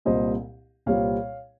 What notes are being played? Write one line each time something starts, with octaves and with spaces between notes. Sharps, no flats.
C2 A#2 G3 C4 C5 D#5
C2 A#2 G3 C4 C#5 F5